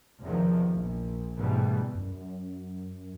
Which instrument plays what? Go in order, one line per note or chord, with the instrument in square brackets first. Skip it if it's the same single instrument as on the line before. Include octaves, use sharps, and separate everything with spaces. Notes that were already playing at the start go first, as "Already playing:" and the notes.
[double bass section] E2 C3 D#3 F3
A#1
G#2 B2 D3 E3 G3 A3
[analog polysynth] F#2